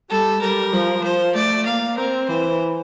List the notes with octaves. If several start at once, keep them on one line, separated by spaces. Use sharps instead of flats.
G3 A4
G3 A#4
F3
F3 C5
A3 D5
A#3 F5
C4 A#4
E3 C5